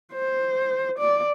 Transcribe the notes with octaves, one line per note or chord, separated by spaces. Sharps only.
C5
D5